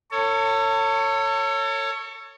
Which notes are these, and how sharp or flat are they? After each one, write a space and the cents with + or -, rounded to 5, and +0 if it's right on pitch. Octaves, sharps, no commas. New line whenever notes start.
A4 +35 C#5 +0